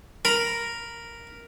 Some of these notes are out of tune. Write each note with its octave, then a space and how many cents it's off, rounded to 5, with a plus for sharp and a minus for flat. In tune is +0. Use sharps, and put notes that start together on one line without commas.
A#4 +0 B5 +0